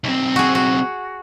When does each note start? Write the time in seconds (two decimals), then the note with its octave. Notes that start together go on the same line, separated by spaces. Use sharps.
0.04 B1 C4
0.36 F#4 G#4
0.55 F#4